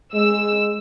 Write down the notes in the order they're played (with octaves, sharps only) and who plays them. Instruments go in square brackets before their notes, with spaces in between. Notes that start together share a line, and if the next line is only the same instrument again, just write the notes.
[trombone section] G#3 [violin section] E6